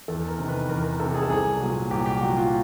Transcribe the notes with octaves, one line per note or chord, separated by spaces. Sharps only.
E2 A4
A#4
C3 D#3
B4
E2 A#4
A#4
C3 D#3 A4
G#4
A4
C2 G#4
A#2 F#3
C2 G4
G4
A#2 F#3 F#4
F4